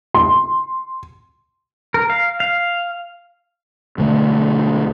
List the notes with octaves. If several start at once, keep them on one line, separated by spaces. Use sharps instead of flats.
C6
A#4
F5
F5
B1 D3 A3